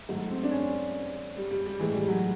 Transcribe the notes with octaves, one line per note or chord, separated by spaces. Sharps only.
G#2 D#3 F#3 A3
C4
D4
C#4
G3
G3
G3
A2 E3 G#3
G3
F#3